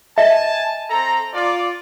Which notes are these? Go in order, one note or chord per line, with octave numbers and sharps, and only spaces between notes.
D#5 E5 G#5 A5
C4 A4 A#5
F4 D5